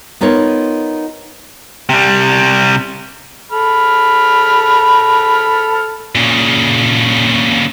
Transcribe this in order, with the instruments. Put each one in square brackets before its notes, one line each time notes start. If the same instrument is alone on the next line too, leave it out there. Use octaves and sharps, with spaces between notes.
[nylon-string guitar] B3 D#4 F4 A#4 C#5
[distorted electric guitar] C3 G3
[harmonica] A4 B5 F6
[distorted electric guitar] A#2 C#3